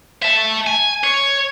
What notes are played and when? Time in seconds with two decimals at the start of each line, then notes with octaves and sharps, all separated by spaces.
0.22 E5 A5
0.67 G#5
1.03 C#5